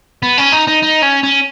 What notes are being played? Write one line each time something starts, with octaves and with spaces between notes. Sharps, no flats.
B3
C#4
D#4
D#4
D#4
C#4
C#4